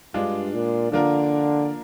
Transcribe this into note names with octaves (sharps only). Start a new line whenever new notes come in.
G2 G#3 D4 F4
A#2
D3 F3 A#3 D4 F4 A#4